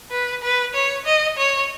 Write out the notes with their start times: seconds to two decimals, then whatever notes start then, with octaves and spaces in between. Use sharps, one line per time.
0.11 B4
0.42 B4
0.74 C#5
1.05 D#5
1.37 C#5